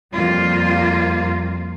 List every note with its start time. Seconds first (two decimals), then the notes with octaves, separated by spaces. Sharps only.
0.14 F2 G3 A#3 F4